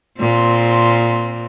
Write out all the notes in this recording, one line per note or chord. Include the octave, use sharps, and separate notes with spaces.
A#2 C4